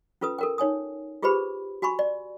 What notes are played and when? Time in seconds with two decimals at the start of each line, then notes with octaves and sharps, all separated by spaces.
0.21 C#4 F4 A4 B4 D#6
0.39 A4 A#4 G5
0.58 D#4 C#5 G#5 D#6
1.22 F4 G4 G#4 B4 C5 B5
1.82 F#4 G#5 B5 C#6
1.99 D5